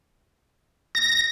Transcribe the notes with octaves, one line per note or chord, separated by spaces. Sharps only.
A#6